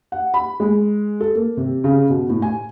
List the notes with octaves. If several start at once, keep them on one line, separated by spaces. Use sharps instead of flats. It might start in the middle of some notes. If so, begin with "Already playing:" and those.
F#5
B5
G#3
A4
A#3
C3
C#3
B2
A2
G#5